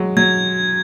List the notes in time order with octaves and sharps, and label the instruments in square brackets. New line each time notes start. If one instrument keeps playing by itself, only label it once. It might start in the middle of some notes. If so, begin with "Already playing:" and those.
Already playing: [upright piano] F#3 G#3
[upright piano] F#3 [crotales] G#6